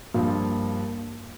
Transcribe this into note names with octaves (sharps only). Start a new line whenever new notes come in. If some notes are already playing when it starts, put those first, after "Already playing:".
G2 F3 A#3 F4